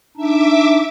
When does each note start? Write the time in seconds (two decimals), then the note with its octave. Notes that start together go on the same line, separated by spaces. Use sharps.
0.17 D4 D#4 E5 D6